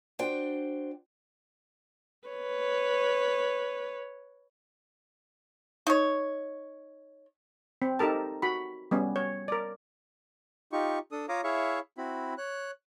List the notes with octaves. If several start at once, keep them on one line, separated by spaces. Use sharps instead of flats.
D4 F#4 C5 G5
B4 C#5
D#4 C#5
C4
D#4 G4 A4 A#4 A5
F#4 B5
G3 B3 C#4
C#5
A#4 D5
D#4 F4 G4 C#6
D4 A4 D#6
F4 C#5 F5 A#5 D6 D#6
E4 G#4 C#5 E5 F5 C#6
C4 E4 F#4 B5
C#5 F#6